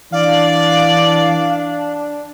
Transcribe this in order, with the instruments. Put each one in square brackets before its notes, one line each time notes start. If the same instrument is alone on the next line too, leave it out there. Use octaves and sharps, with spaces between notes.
[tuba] E3 [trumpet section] D4 [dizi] D5 [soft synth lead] F5